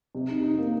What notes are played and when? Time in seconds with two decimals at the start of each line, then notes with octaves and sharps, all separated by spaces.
0.15 C3
0.30 D#4
0.43 D#4
0.58 A#3